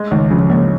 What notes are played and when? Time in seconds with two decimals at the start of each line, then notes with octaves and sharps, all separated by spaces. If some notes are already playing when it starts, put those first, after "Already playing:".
Already playing: G#3
0.11 C#2 D#3
0.31 C#3 F3
0.50 C#2 A#3